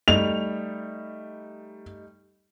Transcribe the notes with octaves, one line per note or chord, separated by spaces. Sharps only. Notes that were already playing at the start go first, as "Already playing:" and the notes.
G3 A3 D#4 F7